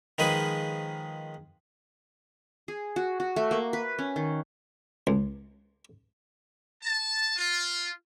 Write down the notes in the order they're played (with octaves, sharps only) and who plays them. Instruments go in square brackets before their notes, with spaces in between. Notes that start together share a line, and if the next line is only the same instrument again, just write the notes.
[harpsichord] D#3 F3 G#3 G#4 B4
[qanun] G#4
F#4
F#4
A3
A#3
B4
C#4
D#3
[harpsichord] C#2
[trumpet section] A5
F4